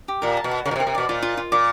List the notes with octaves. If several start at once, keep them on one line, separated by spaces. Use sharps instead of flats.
G4
A#2 A#4
A5
B2
F#5
C#3 A#4
B2
C3
A#4
C3
B2 D5
A#2 F4
F4
F4
A#2 D6